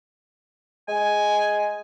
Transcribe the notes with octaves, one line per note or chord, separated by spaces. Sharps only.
G#3 G#5